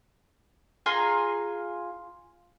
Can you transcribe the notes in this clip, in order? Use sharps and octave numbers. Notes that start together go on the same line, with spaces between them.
F4 G#4 A#5 C6